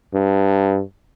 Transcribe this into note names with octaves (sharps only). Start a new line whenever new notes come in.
G2